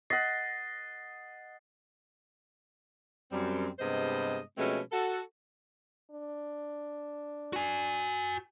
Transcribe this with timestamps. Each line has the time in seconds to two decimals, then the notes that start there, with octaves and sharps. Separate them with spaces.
0.10 D#5 F#5 A6 C7
3.32 F#2 G3 C4
3.79 G2 C3 G#3 B3 C5 D#5
4.58 B2 F3 G#3 A3 C4 C#4
4.92 F#4 A4
6.11 D4
7.53 F#4 G#5